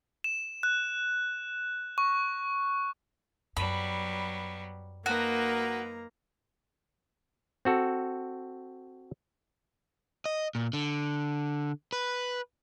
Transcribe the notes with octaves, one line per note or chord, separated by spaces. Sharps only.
E7
F#6
C#6
F#2 F#3 G3 B3 B5
A#3 D#4 F#4 A#4 B4 A#5
C4 F#4 A4
D#5
A#2
D3
B4